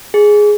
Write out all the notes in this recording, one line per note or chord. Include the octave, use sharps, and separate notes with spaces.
G#4